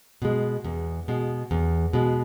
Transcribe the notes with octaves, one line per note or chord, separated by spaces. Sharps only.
B2 G#3
E2
B2 G#3
E2
B2 G#3